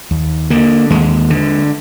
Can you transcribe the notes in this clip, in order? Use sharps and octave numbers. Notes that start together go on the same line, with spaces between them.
D#2
D3 A#3
D#2 G#3
D3